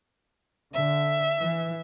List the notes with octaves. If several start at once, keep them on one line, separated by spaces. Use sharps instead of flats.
D3 E5
E3